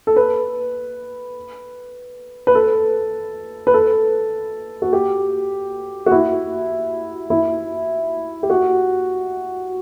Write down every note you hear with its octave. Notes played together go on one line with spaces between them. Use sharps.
A4
B4
B4
A4
B4
A4
F#4
G4
F#4
E4
E4
G4
F#4